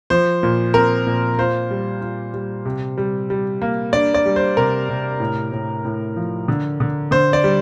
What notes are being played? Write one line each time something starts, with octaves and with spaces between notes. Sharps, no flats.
F3 C5
A#2
C4 A#4
A#2
F4 C5
G3
F4
G3
C3
G3
G3
A#3
D4 D5
D5
G3
C5
C3 A#4
C3
A2
A2
A2
F3
D3
D3
D3 C5
D5
G3